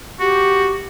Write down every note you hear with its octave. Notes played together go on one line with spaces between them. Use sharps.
F#4 G4